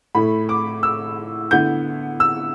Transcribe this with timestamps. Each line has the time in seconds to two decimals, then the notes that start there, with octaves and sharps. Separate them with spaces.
0.15 A2 A3 E4 B5
0.49 D6
0.83 E6
1.51 D3 B3 E4 G6
2.20 E6